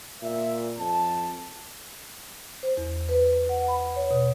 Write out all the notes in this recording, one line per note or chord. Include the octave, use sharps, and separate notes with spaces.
A#2 E5
F2 A5
C5
E2
B4
F#5
B5
C#5
B2